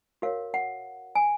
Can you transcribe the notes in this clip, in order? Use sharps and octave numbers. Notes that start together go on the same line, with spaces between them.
F#4 A#4 C#5 F5
F#5
G#5